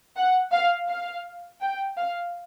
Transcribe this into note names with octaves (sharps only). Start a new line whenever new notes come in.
F#5
F5
F5
G5
F5